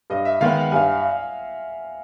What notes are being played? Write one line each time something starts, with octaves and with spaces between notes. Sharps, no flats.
G2 D#5
E5
D#3 G#3 B3 F5
F#5
G2 G#5